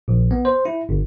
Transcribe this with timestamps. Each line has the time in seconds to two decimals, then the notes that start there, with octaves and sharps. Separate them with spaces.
0.08 A#1
0.31 B3
0.45 C5
0.65 E4
0.89 G1